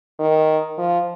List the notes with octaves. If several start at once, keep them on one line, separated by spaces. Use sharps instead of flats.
D#3
F3